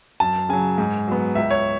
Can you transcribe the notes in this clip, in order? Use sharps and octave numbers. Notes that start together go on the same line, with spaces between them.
F#2 A5
C#3 F#3 G#5
G#2
F#3 B3
C#2 E5
C#5